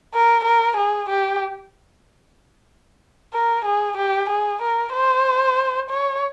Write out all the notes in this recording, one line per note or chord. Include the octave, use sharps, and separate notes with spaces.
A#4
A#4
G#4
G4
A#4
G#4
G4
G#4
A#4
C5
C#5